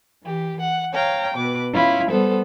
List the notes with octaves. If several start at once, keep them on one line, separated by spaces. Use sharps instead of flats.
E3 G4
F#5
C#5 F5 G5 A#5
B2 B4 D6
C#4 E4 F4 B5
G3 B3 A4 C5